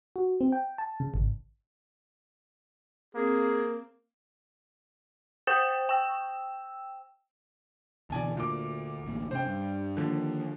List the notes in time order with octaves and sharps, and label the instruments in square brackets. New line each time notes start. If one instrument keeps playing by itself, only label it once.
[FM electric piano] F#4
C4
G5
A5
C#3
G#1
[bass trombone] A#3 [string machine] C4 [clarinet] G#4
[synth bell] C5 G5 D#6 G6
G5 E6
[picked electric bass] D2 B2 E3 [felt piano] D5 G#5 A5
[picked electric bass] D2 [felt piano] A#2 D6
[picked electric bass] A1 D2 A#3
[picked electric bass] C3 A3 C#4 [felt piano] C5 G5
[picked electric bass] G2
[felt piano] D3 F3 [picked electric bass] D#3 A#3